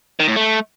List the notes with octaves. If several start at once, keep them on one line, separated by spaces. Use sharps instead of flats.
D#3
A2
A3